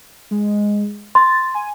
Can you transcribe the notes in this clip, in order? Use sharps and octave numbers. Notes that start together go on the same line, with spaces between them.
G#3
C6 A6
G#5